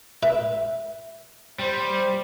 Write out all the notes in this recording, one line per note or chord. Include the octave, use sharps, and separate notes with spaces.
B4 E5
G3 C5